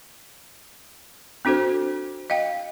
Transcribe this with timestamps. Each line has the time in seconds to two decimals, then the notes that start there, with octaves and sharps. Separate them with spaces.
1.45 C4 D4 F#4 A4 C5
2.30 D#5 F5 G5